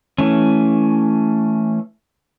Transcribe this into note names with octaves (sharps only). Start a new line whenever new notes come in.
E3 A3 C#4